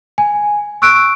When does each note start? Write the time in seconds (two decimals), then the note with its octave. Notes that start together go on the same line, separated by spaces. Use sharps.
0.18 G#5
0.82 C#6 E6 F#6 D7